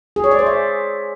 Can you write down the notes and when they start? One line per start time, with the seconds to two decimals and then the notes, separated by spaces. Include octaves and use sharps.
0.16 G#4
0.24 C#5
0.31 D5
0.39 C5
0.46 E5